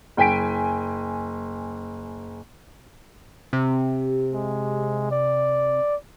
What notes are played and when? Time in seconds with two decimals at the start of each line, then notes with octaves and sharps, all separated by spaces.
0.17 F#1 G5 G#5 B6 D7
3.53 C3
4.33 G#3
5.12 D5